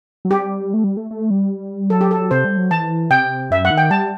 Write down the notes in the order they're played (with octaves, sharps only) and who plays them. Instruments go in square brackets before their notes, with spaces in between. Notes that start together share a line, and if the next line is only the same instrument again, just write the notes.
[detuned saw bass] F#3
[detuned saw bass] G3 [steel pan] G4
[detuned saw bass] A3
G3
A3
A3
G3
[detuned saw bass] F#3 [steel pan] A4
[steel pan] G4
A4
[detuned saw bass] C3 [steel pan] C5
[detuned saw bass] G3
F#3
[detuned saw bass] E3 [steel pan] A5
[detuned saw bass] C3 [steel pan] G5
[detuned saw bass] F#2 [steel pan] E5
[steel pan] F#5
[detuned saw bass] D#3
[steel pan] G5
[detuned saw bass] G3 [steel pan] A5